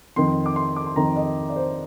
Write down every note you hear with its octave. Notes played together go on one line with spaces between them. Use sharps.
F2 D#3 C6
D6
C6
D6
C6
F2 D#3 A#5
D#5
D5
C5